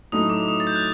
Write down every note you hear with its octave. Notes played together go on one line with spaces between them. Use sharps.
A2 F#3 A3 D#4 D#6
D6
D#6
A6
G6
F#6